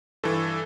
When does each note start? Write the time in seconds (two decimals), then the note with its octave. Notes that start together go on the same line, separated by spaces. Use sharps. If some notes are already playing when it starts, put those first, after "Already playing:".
0.23 G2 E3 A4